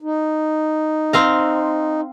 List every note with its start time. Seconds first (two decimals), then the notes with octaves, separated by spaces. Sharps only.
0.02 D#4
1.13 C4 F5 A#5